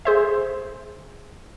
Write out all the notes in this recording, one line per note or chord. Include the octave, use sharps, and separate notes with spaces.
G#4 C5 E5